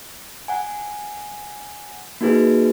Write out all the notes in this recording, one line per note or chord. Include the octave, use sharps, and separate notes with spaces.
F#5 G#5
A#3 D#4 F#4 G#4 B4